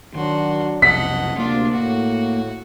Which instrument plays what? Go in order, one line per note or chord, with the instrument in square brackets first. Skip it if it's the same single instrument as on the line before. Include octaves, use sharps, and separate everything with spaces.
[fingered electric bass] D#3 [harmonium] F#3 D4 [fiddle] F#4 C6
[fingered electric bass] B1 F2 C3 [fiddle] D#5 F#5 [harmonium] A5 [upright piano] B6
[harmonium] D2 C3 [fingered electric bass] A#3 [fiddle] D4 F4
[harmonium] A2 [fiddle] F#4